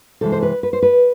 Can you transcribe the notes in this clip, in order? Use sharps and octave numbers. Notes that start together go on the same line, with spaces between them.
C3 E3 G#3 A4
C5
B4
B4
C5
B4